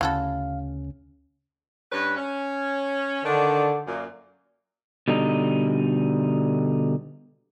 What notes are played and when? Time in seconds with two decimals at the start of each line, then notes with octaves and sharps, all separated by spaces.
0.01 D2 C#3 C#4 E4 F#4 A4 F5
1.92 G2 C#4 B4
2.17 C#4
3.25 D3 D#3 D4
3.87 F#2 A#2
5.08 B2 D3 G3 D#4